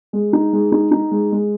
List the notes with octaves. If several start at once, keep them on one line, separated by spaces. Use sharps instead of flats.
G#3
D#4
G#3
D#4
D#4
G#3
G#3